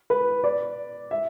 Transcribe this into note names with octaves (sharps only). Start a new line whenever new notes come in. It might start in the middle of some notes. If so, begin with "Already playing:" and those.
B4
D5
E5